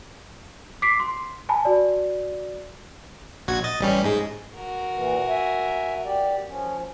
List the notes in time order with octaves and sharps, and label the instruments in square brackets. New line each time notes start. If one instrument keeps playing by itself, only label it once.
[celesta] D6 B6 C7 D7
C6
G#5 A5 B5
F#4 D5
[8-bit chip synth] A#1 F#4 G#6
D#5 A6
A1 G3 C#4
G#2 G#3
[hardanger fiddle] F#4 A#4
[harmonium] A#2 E3
E5 G#5
G4 D5
F3 C#4